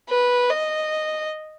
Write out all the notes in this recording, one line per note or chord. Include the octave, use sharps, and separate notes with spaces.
B4
D#5